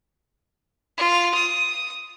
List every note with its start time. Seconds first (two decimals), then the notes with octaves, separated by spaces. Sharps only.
0.98 F4
1.34 D#6